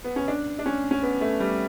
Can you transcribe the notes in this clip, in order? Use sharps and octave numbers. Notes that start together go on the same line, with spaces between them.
B3
C#4
D4
D4
C#4
C#4
B3
A3
G3